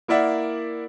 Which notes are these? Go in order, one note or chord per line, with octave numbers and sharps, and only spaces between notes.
A#3 E4 A#4 D5 E5 F#5